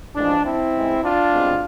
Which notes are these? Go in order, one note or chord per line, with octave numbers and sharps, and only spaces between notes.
A1 A2 F3 G#3 D4
C4 E4
A1 G#2 G#3
D4 F4
C2 B2 G#3 C4